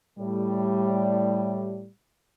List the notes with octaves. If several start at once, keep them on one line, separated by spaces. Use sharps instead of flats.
A2 G3